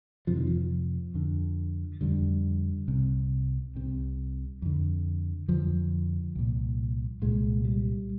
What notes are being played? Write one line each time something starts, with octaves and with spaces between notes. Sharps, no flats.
F2 C3 F3
D#3
F3
F2 D3
F2 D3 G3
C2 C3
C2 C3
F2 D3
F2 D3 F3
C2 A#2
C2 A#2 G#3
G3